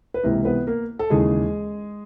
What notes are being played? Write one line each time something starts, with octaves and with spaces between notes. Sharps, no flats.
B4
C#2 C3 E3 A#3 A#4
B3 B4
A#3 A#4
A4
D#2 C#3 E3 G#3 G#4